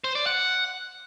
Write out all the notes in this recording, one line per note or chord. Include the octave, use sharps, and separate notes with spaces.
C5
D5
F#5